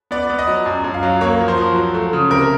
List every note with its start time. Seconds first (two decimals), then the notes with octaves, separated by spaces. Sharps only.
0.11 B3 D5
0.30 B3
0.38 D#5
0.47 F#3
0.66 F#2
0.84 F#2
0.94 F5
1.03 F#3
1.21 A#3 C#5
1.40 F3
1.48 C5
1.58 F3
1.76 F#3
1.94 A3
2.13 C#3
2.31 C3 A#4